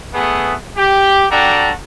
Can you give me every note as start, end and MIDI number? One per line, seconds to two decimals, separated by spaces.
0.13 0.54 57
0.13 0.54 59
0.13 0.54 68
0.77 1.25 67
1.31 1.71 55
1.31 1.71 62
1.31 1.71 66
1.31 1.71 69
1.31 1.71 79
1.31 1.71 82